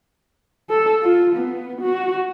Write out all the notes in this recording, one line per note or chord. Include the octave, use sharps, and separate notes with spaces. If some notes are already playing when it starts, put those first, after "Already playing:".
A4
F4
B3
F#4